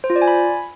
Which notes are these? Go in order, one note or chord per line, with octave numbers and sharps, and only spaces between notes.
C5
F4
D5
G#5
B5